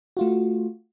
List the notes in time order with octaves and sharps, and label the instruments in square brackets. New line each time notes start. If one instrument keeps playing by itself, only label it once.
[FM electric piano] A3 F4 F#4